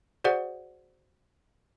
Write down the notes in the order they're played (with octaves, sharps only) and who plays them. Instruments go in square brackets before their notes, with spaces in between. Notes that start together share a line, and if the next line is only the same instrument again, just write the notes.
[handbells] F#4 G#4 C5 D5 F#5